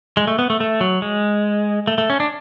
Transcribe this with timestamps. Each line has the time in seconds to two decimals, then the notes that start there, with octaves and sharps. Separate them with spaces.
0.17 G#3
0.27 A3
0.39 B3
0.50 A3
0.60 A3
0.81 F#3
1.02 G#3
1.87 A3
1.98 A3
2.10 C#4
2.20 D4